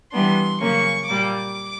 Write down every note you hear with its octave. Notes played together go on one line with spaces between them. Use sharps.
E3 G3 B3 D4 C6
C#3 F#3 A#3 C#4 C#6
A#2 G3 A#3 D6